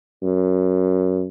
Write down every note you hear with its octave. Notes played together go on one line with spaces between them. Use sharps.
F#2